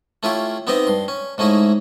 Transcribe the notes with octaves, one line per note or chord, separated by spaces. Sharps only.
A3 C#4 E4 F4 G4
B3 C4 D#4 G4 D#5 E5
G2 C6
C#4
G#2 A3 C#4 D#4 E4